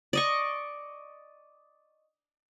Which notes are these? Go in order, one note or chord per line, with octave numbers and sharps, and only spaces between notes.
D5 D#5 C#6